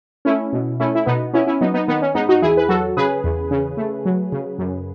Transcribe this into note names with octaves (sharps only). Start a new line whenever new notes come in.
A3 C#4 E4
B2
A3 C#4 E4
E4
B2 B3 D#4
B3 C#4 E4
C#4 E4
F#3 B3 D#4
B3 D#4
D#3 B3 D#4
C#4
G#2 B3 D#4
D#4 F#4
E2 E4 G#4
B4
F#3 F#4 A4
C#3 G#4 B4
E2
C#3
A3
F#3
C#3
F#2